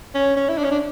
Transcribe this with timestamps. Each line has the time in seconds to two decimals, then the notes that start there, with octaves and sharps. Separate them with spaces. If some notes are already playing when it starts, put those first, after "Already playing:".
0.15 C#4
0.37 C#4
0.49 E4
0.58 D4
0.64 C#4
0.71 D4